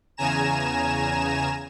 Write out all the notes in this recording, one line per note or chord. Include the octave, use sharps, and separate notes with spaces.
E2 C#3 G#5 A#5 E7